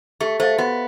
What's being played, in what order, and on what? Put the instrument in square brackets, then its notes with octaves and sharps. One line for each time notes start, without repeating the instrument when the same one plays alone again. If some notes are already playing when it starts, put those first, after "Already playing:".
[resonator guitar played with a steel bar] A3 [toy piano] G4
[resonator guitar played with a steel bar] A3 [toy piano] C5 F5
[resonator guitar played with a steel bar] B3 [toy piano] F#4